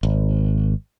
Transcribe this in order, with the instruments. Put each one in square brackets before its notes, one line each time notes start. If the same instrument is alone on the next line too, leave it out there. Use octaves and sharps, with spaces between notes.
[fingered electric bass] G#1